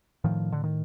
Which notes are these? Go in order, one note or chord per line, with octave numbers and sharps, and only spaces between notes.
A2 D#3 F3
D3
D#3